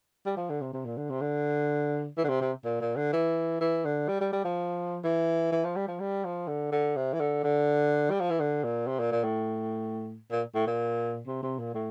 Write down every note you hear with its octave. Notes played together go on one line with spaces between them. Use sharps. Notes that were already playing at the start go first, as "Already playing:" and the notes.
G3
F3
D3
C3
C3
A#2
D3
C3
D3
E3
D3
C3
C3
A#2
A#2
D3
E3
E3
D3
G3
G3
G3
F3
E3
E3
F3
G3
F3
G3
F3
D3
D3
C3
E3
D3
D3
G3
F3
E3
D3
A#2
C3
A#2
A#2
A2
A#2
A2
A#2
C3
C3
A#2
A2